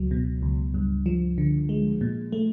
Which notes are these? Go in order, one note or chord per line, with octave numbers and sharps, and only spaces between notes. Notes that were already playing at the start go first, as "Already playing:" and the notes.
Already playing: C#2 F#3
B2
C#2
G2
F3
D3
G#3
A#2
A3